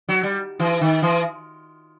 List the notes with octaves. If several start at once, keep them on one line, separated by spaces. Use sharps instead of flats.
F#3
G3
E3
D#3
E3